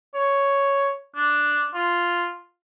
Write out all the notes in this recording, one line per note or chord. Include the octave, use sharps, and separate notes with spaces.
C#5
D4
F4